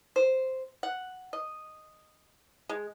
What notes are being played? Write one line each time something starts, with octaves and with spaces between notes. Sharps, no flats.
C5
F#5
D#5
G#3